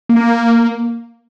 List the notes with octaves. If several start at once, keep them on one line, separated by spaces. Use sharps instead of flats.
A#3